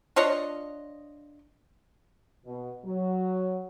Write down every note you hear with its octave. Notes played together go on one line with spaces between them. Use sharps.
D4 F4 C#5 D#5
B2
F#3